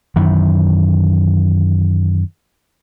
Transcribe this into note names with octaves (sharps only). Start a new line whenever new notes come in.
F#2 D#3 E3